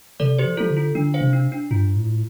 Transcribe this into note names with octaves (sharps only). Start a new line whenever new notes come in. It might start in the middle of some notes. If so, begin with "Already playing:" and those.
C3 A4 D5
G4 C5
F3
F3 F4 A4
D3
F4
D3 D4
C5 F5
C3
D4
D4
G2 F4
A2